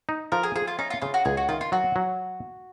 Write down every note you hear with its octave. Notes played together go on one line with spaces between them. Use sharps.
D#4
F3 A#4
G#4
F3 G#4
F4
C#4 D#4
F4
C#3 F4
F#4
C#2 G#4
F#4
D#3 F4
F4
F#3 F#4
F#3